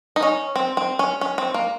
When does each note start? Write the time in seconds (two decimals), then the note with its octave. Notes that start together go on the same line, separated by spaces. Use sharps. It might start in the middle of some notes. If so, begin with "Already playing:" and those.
0.16 D#4
0.23 C#4
0.56 C4
0.77 C4
0.99 C#4
1.21 C#4
1.38 C4
1.54 A#3